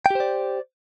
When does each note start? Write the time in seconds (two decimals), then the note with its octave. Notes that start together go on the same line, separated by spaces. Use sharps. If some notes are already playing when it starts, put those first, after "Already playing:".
0.06 G5
0.11 G4
0.15 C5
0.20 D5